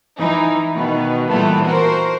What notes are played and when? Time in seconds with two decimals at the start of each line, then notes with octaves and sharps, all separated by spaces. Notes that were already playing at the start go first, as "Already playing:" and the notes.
0.18 E3 D#4
0.75 B2 D#3 B3
1.29 A#2 E3 G3 A3 B3
1.64 F#4 A#4 C5